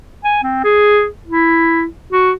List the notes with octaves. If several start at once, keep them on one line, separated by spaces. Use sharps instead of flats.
G#5
C4
G#4
E4
F#4